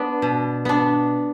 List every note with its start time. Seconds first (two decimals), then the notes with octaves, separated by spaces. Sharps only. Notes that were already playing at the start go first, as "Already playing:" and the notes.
Already playing: B3 D4
0.22 B2
0.65 B3 D4